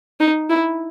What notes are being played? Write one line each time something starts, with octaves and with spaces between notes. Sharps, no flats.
D#4
E4